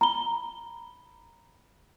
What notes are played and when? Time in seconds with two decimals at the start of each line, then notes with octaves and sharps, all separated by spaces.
0.01 A#5 B5 G7